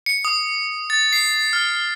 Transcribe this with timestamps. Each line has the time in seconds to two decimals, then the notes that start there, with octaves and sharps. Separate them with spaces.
0.06 C#7
0.25 D#6
0.90 A6
1.13 C7
1.53 F6